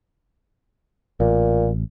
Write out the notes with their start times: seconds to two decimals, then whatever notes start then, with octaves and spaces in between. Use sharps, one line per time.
1.20 A1 A#2